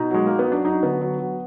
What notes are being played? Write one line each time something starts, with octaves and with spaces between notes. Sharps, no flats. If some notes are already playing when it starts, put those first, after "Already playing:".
Already playing: B2 D#4
F#3 G#3
F#3 A#3
B3
F#3
D4
F#3 D#4
D3 B3
F#3
F#3